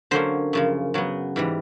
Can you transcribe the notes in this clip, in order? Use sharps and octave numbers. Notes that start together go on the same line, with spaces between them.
D3 F#3 A#3 C#4 C5
F#2 C#3 F3
C#3 F#3 B3
G#2 E3 G3